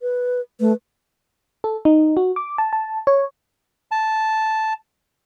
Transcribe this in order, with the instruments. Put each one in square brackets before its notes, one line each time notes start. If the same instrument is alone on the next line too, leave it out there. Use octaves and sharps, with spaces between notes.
[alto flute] B4
[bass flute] A3 [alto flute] B4
[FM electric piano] A4
D#4
F#4
D6
A5
A5
C#5
[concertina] A5